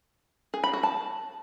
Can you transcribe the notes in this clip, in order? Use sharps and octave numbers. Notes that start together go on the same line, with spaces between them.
G#4
B5
F#4
A5